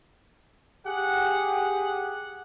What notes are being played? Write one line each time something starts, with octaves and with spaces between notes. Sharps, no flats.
G4 G#4 F#5